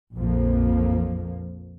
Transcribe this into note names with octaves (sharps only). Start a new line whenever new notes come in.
A#1 F2 F3 A#3